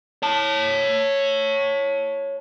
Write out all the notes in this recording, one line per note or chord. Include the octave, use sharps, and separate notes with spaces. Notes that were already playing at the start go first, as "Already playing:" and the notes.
C#5 A5